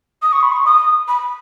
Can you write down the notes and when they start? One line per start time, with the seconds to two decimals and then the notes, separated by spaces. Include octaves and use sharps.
0.22 D#6
0.32 C#6
0.42 B5
0.52 C#6
0.65 D#6
1.08 B5